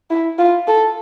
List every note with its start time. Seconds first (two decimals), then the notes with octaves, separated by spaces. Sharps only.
0.10 E4
0.39 F4
0.67 A4